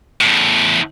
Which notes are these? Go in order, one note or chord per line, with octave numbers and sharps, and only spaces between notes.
E2 A2